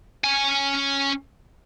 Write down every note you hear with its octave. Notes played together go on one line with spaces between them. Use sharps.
C#4 G#5